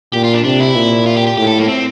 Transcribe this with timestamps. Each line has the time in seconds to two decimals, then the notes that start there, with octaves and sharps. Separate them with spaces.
0.13 A#2 G4
0.24 F4
0.34 D4
0.44 C3 D4
0.60 E4
0.75 A#2
1.06 F4
1.17 G4
1.27 G4
1.38 A2 G4
1.47 A4
1.58 A#3
1.68 C4